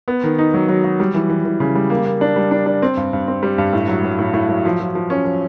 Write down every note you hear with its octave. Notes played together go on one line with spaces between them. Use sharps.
B3
D#3
D#4
F#3
F#3
F#3
G3
E3
E3
E3
C#3
G3
A#3
A#3
D4
G3
D4
D4
C4
G2
G2
C4
G3
G2
A2
F#3
F#3
A2
A2
F#3
F3
F3
F3
C#4
F3